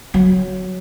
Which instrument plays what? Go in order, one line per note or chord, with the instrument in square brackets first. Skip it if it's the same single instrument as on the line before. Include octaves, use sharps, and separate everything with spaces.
[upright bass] F#3